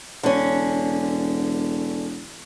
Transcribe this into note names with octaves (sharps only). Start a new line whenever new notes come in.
E1 D3 C#4